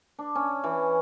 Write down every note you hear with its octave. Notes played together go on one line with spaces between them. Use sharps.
D4
C#4
E3